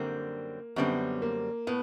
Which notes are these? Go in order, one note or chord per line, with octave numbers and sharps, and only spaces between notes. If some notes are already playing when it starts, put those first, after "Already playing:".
Already playing: F#2 D3 G3 A#3 C4
F#2 D3 G3 B3 C4
A#3
A2 B3